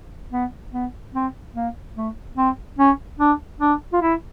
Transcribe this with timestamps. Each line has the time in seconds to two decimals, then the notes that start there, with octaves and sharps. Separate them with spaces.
0.32 B3
0.73 B3
1.14 C4
1.55 A#3
1.96 A3
2.37 C4
2.78 C#4
3.19 D4
3.60 D4
3.93 F4
4.02 E4